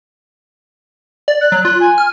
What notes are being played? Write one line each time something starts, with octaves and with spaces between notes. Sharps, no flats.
D5
F#6
F#3
F4 F#6
G#5
F6